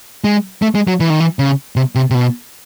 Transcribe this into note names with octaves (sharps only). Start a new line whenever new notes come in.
G#3
A3
G#3
F#3
E3
D#3
E3
C#3
C3
C3
C3
B2